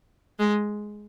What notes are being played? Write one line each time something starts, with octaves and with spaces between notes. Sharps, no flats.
G#3